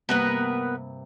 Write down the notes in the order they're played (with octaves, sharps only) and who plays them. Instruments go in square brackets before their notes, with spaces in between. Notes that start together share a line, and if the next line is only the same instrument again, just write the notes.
[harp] G2 C3 A#3 [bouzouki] B3 A#4 B4